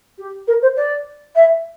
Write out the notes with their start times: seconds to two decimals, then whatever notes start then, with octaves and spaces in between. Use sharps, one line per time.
0.18 G4
0.47 A#4
0.62 C5
0.76 D5
1.35 E5